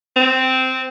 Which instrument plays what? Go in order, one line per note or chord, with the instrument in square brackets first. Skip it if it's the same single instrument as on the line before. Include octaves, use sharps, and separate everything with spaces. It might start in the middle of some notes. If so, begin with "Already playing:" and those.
[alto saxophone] C4